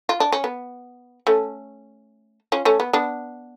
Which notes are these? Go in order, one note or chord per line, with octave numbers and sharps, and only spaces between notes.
F4
D4
C#4
B3
A3 C#4
C#4 F4
A3 C#4
B3
B3 D4